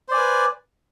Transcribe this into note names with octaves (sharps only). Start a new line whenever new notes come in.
B4 C5 D5 G#5